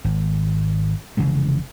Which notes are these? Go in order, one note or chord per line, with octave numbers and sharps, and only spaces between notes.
G#1
F1 C#3 E3 G#3